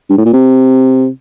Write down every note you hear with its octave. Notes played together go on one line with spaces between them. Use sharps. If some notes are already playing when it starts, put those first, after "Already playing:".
G2
A2
A#2
C3